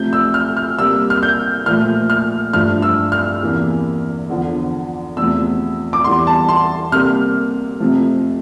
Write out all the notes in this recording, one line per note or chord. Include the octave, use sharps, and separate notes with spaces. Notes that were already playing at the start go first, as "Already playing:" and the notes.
Already playing: C3 F3 A3 G6
E6
F6
F6
C3 G3 A#3 E6
F6
G6
A#2 F3 A3 F6
F6
G2 F3 A3 F6
E6
F6
E2 C3 E3 A#3
E2 D3 F3
E2 C3 F3 A3 E6
D6
E2 E3 G3 C6
A5
C6
C3 G3 A#3 F6
F2 C3 F3 A3